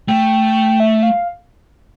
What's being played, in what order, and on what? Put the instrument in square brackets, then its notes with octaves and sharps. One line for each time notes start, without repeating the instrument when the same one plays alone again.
[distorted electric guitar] A3 [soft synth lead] G5
[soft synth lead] E5
F5